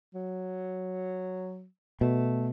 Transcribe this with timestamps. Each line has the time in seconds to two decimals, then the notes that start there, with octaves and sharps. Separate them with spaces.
0.14 F#3
2.01 B2 A3